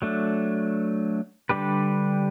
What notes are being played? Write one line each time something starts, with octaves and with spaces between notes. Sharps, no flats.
F#3 A3 D4
D3 G3 D4 G4 B4